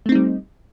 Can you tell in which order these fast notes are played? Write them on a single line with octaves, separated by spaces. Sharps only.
A3 C4 D#4 G3